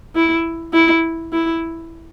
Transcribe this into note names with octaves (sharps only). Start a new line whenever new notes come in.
E4
E4
E4